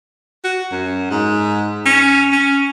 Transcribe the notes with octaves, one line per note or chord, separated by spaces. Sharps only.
F#4
F#2
G#2
C#4
C#4